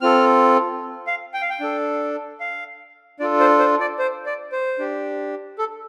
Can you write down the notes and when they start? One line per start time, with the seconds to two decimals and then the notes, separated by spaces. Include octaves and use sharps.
0.01 C4 F4 A4 F6
1.07 F5
1.34 G5
1.41 F5
1.50 G5
1.60 D4 A4
2.40 F5
3.20 D4 F4 A4 D5
3.40 C5
3.59 C5
3.80 D5
3.99 C5
4.26 D5
4.52 C5
4.79 D4 G4
5.58 A4